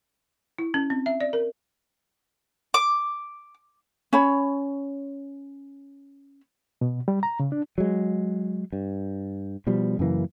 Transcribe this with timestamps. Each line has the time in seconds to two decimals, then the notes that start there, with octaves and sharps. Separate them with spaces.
0.59 E4
0.74 C#4
0.90 C4
1.06 E5
1.21 D5
1.33 A#4
2.74 D6
4.13 C#4 C#5 B5
6.81 B2
7.08 G3
7.23 A#5
7.40 C#3
7.52 D4
7.78 F#3 G#3
8.73 G2
9.67 B2 F3 G3
9.99 F#2 C#3 E3 A#3